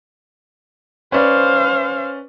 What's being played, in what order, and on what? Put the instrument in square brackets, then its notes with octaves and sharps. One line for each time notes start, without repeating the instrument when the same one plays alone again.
[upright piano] C#4 B4 D5 [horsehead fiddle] C5 F5